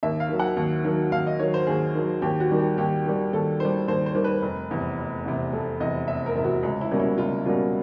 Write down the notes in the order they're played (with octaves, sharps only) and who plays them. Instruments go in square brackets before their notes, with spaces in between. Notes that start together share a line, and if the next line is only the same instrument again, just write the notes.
[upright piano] D#2 E5
F5
D#3 F#3
F#5
D#2
D#3 F#3
D#2 F5
D#5
D#3 F#3 C#5
C5
D#2 G#4
D#3 F#3
D#2 G4
F#4
D#3 G3
G4
D#2 G4
D#3 G3
D#2 A4
D#3 G3 C5
D#2 C5
C5
D#3 G3
B4
F1
E2 C3
F1
E2 C3
F1 A4
E2 C3 D#5
F1 E5
A#4
E2 C3
F#4
C#2
E4
B2 G3 A#3 C#4
E4
C#2 F4
B2 G3 A#3 C#4 F4